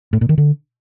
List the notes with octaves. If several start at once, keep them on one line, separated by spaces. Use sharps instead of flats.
A2
A#2
D#3
D3